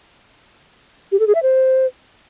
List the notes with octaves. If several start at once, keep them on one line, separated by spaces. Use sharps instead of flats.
G4
A4
G#4
E5
C5